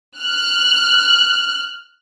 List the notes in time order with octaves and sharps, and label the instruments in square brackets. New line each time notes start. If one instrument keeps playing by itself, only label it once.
[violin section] F6 F#6